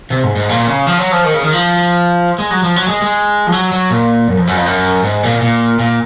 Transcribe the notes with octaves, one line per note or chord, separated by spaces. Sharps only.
C3
G#2
G#2
A#2
C#3
F3
F#3
F3
D#3
C#3
D#3
F3
G#3
F#3
F3
F#3
G#3
G#3
F3
F#3
F#3
A#2
F#2
F2
F#2
F2
F#2
G#2
A#2
A#2
A#2